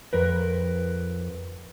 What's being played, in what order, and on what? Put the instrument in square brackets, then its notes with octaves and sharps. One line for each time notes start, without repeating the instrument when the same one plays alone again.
[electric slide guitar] F2 A#4 B4